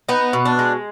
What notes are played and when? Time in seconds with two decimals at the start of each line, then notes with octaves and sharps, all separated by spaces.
0.09 B3 D#4
0.33 B2
0.45 D4
0.59 G#3